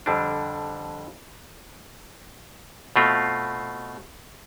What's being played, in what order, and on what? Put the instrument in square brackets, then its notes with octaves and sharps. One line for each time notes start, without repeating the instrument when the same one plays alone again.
[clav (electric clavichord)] F2 D3 G3 D4
B2 A3 C4 F4